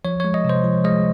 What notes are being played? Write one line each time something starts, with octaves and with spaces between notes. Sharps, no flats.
F3 C#5
G#3 C#5
D#5
C3
C5
F3
G#3 D#5